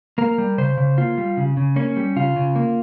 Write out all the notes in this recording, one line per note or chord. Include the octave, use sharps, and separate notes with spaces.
A#3 A#4
G3
C#3 C5
C#3
A#3 F4
G3
C#3
C#3
A#3 C#4
G3
C#3 F4
C#3
A#3